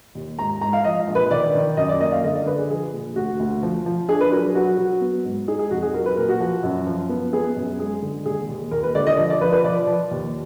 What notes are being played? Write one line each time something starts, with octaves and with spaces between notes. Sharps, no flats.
D#2
G#2 A#5
G#2 A#5
F5
F3 D#5
A#1
B4
D#3 D5
D#3
F#2 D#5
D5
A#3 D#5
F5
D3 D#5
D5
D3 B4
G#4
F3 G#4
A#2
D2 F#4
D2
F3
F3
D4 G#4
B4
F#3 A#4
F#3 F#4
F#3
B3
G#2
D#4 G#4
G#4
F2 F#4
G#4
F#3 A#4
B4
A#2 A#4
F#4
F3
F#2
F3
B3
B3 G#4
F#2
G#3 G#4
D3
D#2 G#4
D#2
D#2 A#4
B4
D3 D5
D#5
F3
D5
F3 B4
B4
F3 D5
F3
D#2